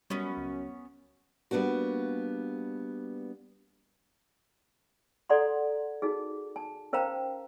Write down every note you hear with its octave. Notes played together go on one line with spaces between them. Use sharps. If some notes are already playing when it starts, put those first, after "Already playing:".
F#2 G3 B3 C#4
C#2
G3 A#3 B3 D4 F#4
A4 D5 F#5 A#5 C6
D#4 F#4 G#4
A5
C#4 A#4 C5 F5 G5 A#5